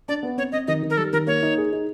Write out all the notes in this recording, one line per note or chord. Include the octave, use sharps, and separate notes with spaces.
D4 D5
B3
C4 C#5
C4 D#5
D#3 D#5
D#3
A#4
G3 A4
D#3 A#4
A#3 C#5
D#4
G#4
D#4